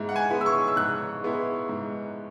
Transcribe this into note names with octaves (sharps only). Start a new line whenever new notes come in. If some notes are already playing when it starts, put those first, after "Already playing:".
Already playing: G#2 G#3 B3 E4
F#5
G#5
G#3 B3 E4
E6
C#6
E6
G#2 F#6
G#3 B3 E4
G#2